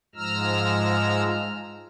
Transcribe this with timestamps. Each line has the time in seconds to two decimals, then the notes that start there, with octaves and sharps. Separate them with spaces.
0.15 G#2 F3 G#3 A#5 E6 F6